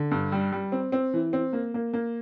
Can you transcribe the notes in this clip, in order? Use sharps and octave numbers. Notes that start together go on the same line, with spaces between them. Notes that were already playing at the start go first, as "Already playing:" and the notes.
Already playing: D3
G2
G3
G3
C4
C4
E3
C4
A#3
A#3
A#3